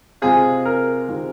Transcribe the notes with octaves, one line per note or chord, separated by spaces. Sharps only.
C3 G#3 C4 F4 G#4
A#4
C3 D#3 G#3 C4 F4